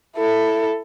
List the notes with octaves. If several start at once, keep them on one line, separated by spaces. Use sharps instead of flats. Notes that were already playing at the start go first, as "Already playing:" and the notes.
E4 A4